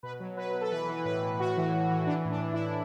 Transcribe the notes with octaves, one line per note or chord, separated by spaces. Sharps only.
B2 B4
F#3
F#3 B4
B2
A4
E3 B4
E3
A2 B4
A2
A2 F#4
E3
E3
E3
E3 D4
A2
D4
E3
E4
A2